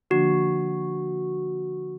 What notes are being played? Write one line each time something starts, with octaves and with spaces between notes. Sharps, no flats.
D3 F3 A#3 D4 F#4